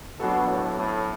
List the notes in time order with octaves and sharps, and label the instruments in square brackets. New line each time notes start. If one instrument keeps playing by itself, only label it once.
[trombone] B2 [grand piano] F#3 B3 D4 F#4 A4
[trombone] A2
A2